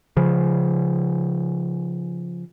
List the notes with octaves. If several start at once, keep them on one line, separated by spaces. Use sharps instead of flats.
C#3 F3